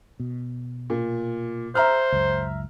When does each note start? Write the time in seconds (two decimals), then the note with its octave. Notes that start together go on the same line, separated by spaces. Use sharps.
0.20 B2
0.90 A#2
1.75 C5 E5 A#5 F6
2.12 C#2 F#2